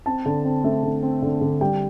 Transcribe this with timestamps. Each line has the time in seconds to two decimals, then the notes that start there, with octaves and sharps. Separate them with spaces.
0.06 C4 A5
0.26 D3
0.45 C4
0.64 A3
0.83 D3
1.03 C4
1.22 D3
1.41 D3
1.61 G3 G5